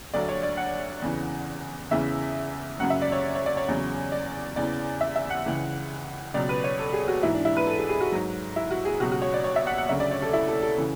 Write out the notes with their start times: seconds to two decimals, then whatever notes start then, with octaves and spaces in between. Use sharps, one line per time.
0.14 D2 D3 F#3 D5
0.29 C#5
0.43 D5
0.57 F#5
1.02 E2 C#3 E3
1.91 E2 C#3 E3 E5
2.79 F#2 C#3 F#3 F#5
2.90 E5
3.02 D5
3.12 C#5
3.35 C#5
3.46 D5
3.57 C#5
3.68 E2 C#3 F#3
4.12 D5
4.56 E2 C#3 E3 D5
5.01 E5
5.16 E5
5.30 F#5
5.46 C#2 C#3 E3
6.34 C#2 B2 F#3 D5
6.49 B4
6.64 C#5
6.79 A4
6.93 G#4
7.08 F#4
7.23 G#2 E3 E4
7.34 D4
7.45 E4
7.57 B4
7.67 A4
7.78 G#4
7.89 G#4
8.01 F#4
8.12 G#2 F#3
8.56 E4
8.71 F#4
8.85 G#4
9.00 C#2 B2 F#3 F#4
9.12 F#4
9.22 C#5
9.34 D5
9.44 C#5
9.56 E5
9.67 F#5
9.78 F#5
9.89 D2 C#3 F#3 E5
10.00 D5
10.11 C#5
10.22 A4
10.33 E4
10.48 A4
10.63 A4
10.78 C#3 E3